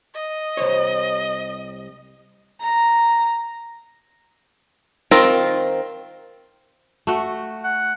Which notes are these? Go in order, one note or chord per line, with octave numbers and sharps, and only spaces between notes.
D#5
C2 C5 C#5
A#5
D#3 C4 F4 A#4
A3 F#4
F#5